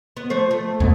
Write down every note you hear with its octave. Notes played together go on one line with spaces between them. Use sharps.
B3
F3 A3 C5
A3
D#2 G#2 B2 A3